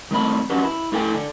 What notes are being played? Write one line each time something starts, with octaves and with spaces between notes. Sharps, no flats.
D#3 A3 C4 B5
C#4 D4 F#4 G4 B4
E4
A2 E4 A4 G5 G#5
D3